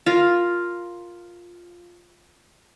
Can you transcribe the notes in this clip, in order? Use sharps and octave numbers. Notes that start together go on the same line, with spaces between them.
F4 A#4